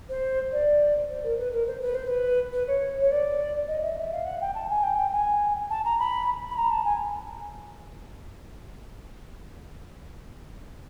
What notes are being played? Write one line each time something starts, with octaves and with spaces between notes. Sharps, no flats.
C5
D5
C5
A#4
B4
A#4
C5
B4
C5
B4
B4
C#5
C#5
D5
D#5
E5
E5
F5
F#5
G5
A5
G#5
G5
G5
G#5
A5
A#5
B5
B5
A#5
A5
G#5